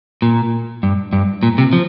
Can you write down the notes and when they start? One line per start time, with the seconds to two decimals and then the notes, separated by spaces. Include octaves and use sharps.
0.22 A#2
0.83 G2
1.13 G2
1.43 A#2
1.58 C3
1.73 F3